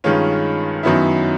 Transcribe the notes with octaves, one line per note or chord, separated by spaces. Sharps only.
G2 D#3 G#3 C#4 F4
F#2 D#3 F#3 B3 E4